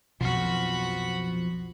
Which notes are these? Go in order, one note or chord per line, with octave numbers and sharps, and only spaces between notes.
B1 F2 B2 F3 F#4 C5 B5 F6